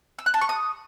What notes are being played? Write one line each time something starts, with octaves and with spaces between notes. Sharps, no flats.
E6
F#6
A5
C#6
D#6